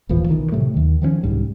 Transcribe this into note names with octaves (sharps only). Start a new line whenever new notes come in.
D#1 A1 E3 F3
B1 D#3 E3
A2 C3 F#3 A3
D#2 D#3
D#3 F3 A#3 C#4
C2 G#2 G3